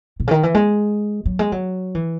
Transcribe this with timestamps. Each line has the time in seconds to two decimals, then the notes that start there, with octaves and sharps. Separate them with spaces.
0.20 B2
0.27 C#3
0.31 D#3
0.43 E3
0.54 G#3
1.26 F#3
1.39 G#3
1.52 F#3
1.95 E3